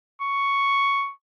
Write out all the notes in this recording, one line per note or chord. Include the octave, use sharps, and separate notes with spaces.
C#6